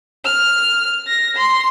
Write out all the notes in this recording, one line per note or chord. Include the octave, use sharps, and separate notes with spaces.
F6
A#6
C6